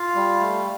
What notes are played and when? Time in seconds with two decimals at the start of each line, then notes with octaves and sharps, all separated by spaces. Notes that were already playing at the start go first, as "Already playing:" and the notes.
Already playing: F4 F5
0.15 G3
0.40 A3